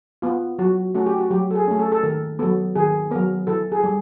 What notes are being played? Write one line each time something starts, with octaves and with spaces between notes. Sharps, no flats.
B3 F4
F#3 F#4
A3 C#4 F#4
G4
F#4
F#3 G4
A4
G#4
A3 C#4
A4
A4
D#3 A#4
F#3 B3 A4
D#3 G#4
F#3 B3 A#4
E3 A4
G#4
G3